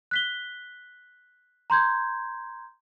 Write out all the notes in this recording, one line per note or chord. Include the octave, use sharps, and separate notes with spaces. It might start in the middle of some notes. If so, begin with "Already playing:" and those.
F#6 B6 G7
A#5 C6 G6 G#6